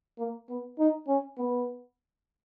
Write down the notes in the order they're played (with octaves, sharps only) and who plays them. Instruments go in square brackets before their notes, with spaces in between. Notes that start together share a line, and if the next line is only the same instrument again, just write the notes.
[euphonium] A#3
B3
D#4
C#4
B3